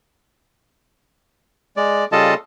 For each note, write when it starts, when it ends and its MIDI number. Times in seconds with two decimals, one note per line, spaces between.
1.77 2.05 56
1.77 2.05 74
2.12 2.34 49
2.12 2.34 55
2.12 2.34 65
2.12 2.34 69
2.12 2.34 75
2.12 2.34 81